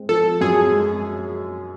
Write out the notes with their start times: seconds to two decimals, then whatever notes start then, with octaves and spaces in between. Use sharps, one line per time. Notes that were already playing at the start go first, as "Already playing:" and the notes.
Already playing: G#3 C4
0.09 F3 A4
0.41 F#2 G#4
0.73 G#3